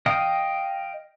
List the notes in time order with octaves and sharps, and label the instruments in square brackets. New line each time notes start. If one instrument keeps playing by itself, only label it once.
[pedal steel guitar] D#5 F5 G5 D#6